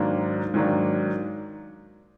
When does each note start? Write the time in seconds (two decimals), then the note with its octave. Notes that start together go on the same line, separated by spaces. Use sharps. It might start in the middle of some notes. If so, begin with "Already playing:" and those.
Already playing: G#2 D#3 F#3 A#3 D4
0.54 G#2 D#3 F#3 A#3 D4